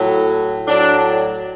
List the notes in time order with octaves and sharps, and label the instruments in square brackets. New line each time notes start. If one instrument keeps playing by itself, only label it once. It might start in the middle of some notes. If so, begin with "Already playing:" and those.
Already playing: [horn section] A2 F#3
A2 F#3 D4